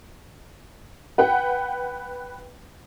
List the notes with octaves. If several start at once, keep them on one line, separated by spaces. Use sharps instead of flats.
B4 F#5 G5